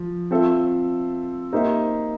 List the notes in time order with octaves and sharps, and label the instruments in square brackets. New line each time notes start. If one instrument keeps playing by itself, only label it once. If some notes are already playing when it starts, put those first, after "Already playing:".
Already playing: [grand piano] F3
C4 F4 A4 C5 E5
A#3 D#4 G4 C5 E5